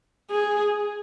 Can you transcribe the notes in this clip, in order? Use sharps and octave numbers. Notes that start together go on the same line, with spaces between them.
G#4